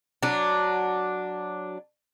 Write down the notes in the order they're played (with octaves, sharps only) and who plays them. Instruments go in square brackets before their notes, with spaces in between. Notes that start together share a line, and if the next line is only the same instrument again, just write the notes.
[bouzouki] F#3 D4